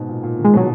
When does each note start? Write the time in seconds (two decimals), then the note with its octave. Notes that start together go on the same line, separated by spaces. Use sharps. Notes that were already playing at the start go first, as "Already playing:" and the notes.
Already playing: G#2 B2
0.09 A#2
0.23 A#2
0.39 D#3
0.45 G#3
0.54 B2 F#3